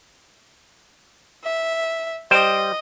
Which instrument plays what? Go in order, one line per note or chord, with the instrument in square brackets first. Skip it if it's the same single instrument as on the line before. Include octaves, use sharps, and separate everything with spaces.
[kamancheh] E5
[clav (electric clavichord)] G3 C5 G5 [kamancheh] D#5